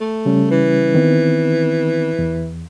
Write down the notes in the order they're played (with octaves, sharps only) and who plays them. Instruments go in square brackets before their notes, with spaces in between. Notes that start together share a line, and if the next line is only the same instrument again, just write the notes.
[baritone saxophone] A3
[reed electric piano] C#3 G3 C#4
[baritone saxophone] E3
[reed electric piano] D#3 B3 C4
E2